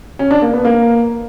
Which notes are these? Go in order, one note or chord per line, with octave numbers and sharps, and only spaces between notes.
C#4
D4
A#3
B3
A#3